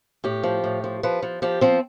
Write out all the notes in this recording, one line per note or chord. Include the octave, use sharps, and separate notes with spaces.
A2 G4
F3
A2
F3
F3 B4
F3
F3 G4
F3 C4